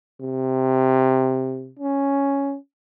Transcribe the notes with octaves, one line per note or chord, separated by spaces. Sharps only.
C3
C#4